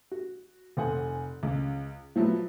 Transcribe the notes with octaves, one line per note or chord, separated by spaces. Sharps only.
F#4
F1 C5 F#5 G#5
C#2
F3 F#3 A3 E4 F4 B4